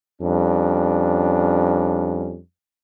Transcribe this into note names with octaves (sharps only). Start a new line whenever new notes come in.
F2 G3 C#4 D4